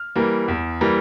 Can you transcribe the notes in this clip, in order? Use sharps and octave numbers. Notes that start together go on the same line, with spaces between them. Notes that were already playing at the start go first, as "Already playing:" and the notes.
Already playing: F6
E3 G3 A#3
E2
E3 G3 A#3